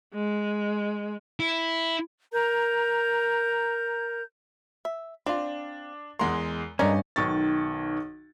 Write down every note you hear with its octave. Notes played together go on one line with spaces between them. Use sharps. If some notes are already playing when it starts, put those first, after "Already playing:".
G#3
E4
A#4 A#5 G6
E5
C4 D4 F4
E2 G#3 A#4 F#5 C6
G2 G#3 C#4 D#4 A#4 D5 D#5
B1 D#3 C#6 A6